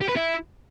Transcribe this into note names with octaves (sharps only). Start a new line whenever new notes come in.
G4
B4
E4